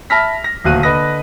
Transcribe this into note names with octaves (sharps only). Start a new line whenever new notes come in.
E5 A5 B5 F6 A#6 B6
A#6
D#1 D2 F#4 F5 F#6 D#7
D3 B4 D#5 D#6 A#6